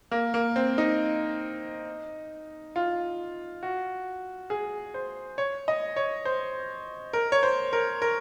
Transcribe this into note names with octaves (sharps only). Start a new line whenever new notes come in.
A#3
A#3
C4
D#4
F4
F#4
G#4
C5
C#5
D#5
C#5
C5
A#4
C#5
C5
A#4
A#4